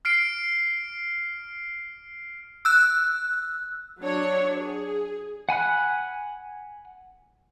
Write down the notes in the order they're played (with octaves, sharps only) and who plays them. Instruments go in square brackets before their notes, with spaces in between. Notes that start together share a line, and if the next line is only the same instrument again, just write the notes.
[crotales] F6 C7 D7
[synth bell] E6 F#6
[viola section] F#3 D4 C#5
G#4
[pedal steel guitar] F#5 G#5 B5 F#6